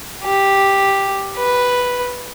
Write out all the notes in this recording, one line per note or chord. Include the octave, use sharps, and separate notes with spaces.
G4
B4